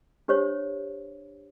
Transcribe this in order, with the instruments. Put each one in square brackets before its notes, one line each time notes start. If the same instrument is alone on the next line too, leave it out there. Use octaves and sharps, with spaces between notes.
[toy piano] D4 G4 C5 C#5